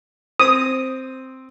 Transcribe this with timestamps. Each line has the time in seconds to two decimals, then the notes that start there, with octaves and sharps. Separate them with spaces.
0.40 C4 D#6